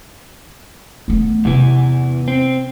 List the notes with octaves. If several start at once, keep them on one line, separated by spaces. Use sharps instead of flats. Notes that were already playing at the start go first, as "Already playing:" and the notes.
A3 B3
E2 C3 E3
C4